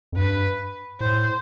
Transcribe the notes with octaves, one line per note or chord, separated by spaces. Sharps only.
F2
G2 B4
A2 C5